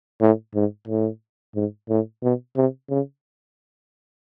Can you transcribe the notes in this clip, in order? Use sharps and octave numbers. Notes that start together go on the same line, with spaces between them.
A2
G#2
A2
G#2
A2
B2
C3
C#3